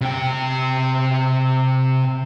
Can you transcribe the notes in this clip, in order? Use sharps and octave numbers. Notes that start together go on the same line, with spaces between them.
C3 G5